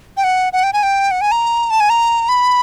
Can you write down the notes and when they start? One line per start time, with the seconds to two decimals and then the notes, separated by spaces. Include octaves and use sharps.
0.17 G5
0.24 F#5
0.53 F#5
0.63 G5
0.73 G#5
0.83 G5
1.11 F#5
1.21 G#5
1.32 A#5
1.70 A5
1.80 G#5
1.90 A#5
2.29 B5